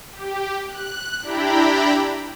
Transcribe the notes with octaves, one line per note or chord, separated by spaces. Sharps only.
G4
F#6
D4 E4 G4 G5 A#5 B5